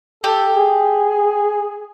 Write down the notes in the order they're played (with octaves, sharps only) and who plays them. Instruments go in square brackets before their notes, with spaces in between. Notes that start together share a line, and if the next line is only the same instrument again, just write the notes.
[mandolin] G4 [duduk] A4
[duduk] G#4